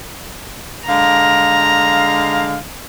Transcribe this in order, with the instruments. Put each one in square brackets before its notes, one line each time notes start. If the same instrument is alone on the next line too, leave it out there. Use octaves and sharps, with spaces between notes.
[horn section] D3 G#3 F5 [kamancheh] A#5